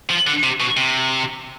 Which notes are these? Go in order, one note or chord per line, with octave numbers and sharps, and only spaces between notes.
F3
D3
C3
B2
C3